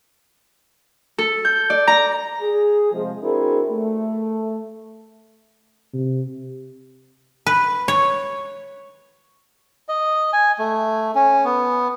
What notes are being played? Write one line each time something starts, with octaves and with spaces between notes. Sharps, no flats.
A4
G6
D5
A#5
G#4
C3 F3 G#3
C4 D4 E4 F#4 G#4 A#4
A3
C3
B4
C#5
D#5
G#5
A3
C#4
B3